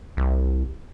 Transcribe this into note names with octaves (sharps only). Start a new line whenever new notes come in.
C2